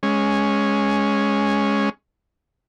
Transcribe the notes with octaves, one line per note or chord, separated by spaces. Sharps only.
G#3 C#4